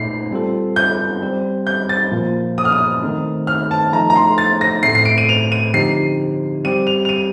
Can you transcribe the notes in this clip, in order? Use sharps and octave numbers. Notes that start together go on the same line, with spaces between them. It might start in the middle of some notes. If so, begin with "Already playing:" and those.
Already playing: A#2 A3 D#4 C7
G3 C4 F4 A4
G6
G3 C4 G4
G6
A6
A#2 F3 A#3
D#6
F6
D#6
D#3 A3 C4 D#4
F6
A5
F3 A3 D#4 A#5
A#5
C6
A6
A#6
A2 A3 C4 C7
C7
D7
D#7
F7
D#7
D3 F3 C4 D#4 G4 C7
G3 C4 G4 D#7
F7
F7
D#7